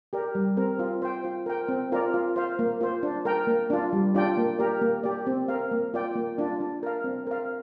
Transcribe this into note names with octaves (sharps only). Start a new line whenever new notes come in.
G4 A#4 D5
G3
C4 A#4
F4
C5 G5
F4
A#4 G5
C4
F4 A#4 D5
F4
C5 F5
A#3
F4 C5
D4
A#4 G5
A#3
D4 F4
G3
D4 F4 D5 G5
A#3
G4 A#4 D5
A#3
G4 D5
C4
A#4 F5
A#3
F4 D5 G5
A#3
D4 F4
D4
A#4 F5
C4
A#4 F5